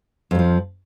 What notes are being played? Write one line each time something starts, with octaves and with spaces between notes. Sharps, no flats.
F2 F3 F#3